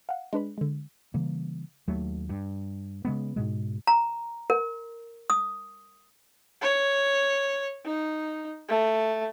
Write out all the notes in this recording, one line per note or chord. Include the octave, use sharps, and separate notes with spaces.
F5 F#5
G#3 D4 B4 B5
D3 G#3
C#3 E3 G3 A#3
D#2 F#3 A3
G2
C#3 G#3 B3
G#2 B2 G#3
A#5
A#4
D#6
C#5
D#4
A3